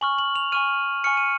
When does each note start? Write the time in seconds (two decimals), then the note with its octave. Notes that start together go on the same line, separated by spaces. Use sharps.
0.01 G#5 C#6 F6 F#7
0.18 F#7
0.36 F7
0.52 G#5 C#6 F6 D#7
1.04 G#5 C#6 F6 C#7
1.17 D#7